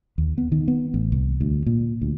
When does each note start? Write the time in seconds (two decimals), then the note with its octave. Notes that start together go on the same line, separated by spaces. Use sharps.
0.18 D#2
0.38 B3
0.52 D#3
0.68 B3
0.94 A1
1.12 C2
1.41 D2
1.66 A#2
2.02 D2